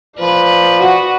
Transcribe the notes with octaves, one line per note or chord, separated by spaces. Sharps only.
F3 B4 D5
F#4